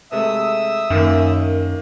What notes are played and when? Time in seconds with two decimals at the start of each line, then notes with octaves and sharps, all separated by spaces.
0.12 C3 G#3 A3 E5 D#6 E6
0.90 F#2 D#3 A#3